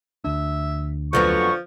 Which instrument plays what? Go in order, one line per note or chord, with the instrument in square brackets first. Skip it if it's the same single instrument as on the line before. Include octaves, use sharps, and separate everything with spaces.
[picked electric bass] D2 D4 [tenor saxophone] E5
[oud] F2 F#3 B3 [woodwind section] D3 C#6 [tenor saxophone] F3